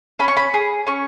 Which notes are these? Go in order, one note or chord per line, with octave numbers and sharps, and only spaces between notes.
C#4 B5
C#6
B5
G#4
C#4 C#6